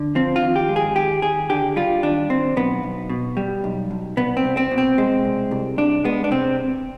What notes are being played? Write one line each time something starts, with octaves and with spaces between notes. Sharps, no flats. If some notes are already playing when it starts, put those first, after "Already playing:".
Already playing: D3
F3 C4
F4
D#2
G4
G#3
G#4
D#2 G4
D#2 G#4
D3 G4
G3 F4
D#2 D4
D#2 C4
B1 B3
B1
B2
G3
B1
B1
C2 B3
C4
C2
C4
B2
C4
G#3
C2
C2
C2 D4
G#3 B3
D4
C3 C4